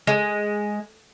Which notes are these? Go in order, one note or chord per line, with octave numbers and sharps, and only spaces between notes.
G#3